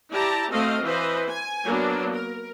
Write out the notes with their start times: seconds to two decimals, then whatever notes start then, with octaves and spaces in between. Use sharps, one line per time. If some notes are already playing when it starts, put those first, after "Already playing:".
0.10 E4 G4 D5 A5 A#5
0.52 A3 C4 F#4 C5 D#5 F5
0.82 E3 B4 C5 D#5
1.27 G#5
1.64 F#3 A#3 B3 D4
2.13 A#4